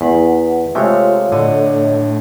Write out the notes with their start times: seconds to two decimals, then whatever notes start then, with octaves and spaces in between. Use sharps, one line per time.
0.01 E2 B4 F#5
0.75 C3 G#3 A3 F4 C#5 F5
1.32 A2 D3 D4 C#5 D#5